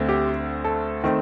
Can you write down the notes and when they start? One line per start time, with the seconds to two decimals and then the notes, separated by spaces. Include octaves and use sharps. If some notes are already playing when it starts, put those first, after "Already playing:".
Already playing: D2 D3 A3 C4
0.09 G4
0.65 A4
1.04 D#3 A3 C4